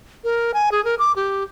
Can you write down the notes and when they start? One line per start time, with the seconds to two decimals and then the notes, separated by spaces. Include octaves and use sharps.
0.24 A#4
0.54 G#5
0.72 G#4
0.85 A#4
0.99 D6
1.16 G4